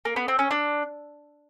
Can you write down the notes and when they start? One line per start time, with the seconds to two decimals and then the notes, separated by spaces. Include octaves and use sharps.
0.05 A#3
0.16 B3
0.28 C4
0.39 C#4
0.51 D4